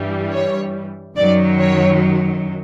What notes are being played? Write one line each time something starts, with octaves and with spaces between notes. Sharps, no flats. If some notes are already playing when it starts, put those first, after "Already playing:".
Already playing: G2 E3 G3
C#5
F#2 D#3 F#3 D5
C#5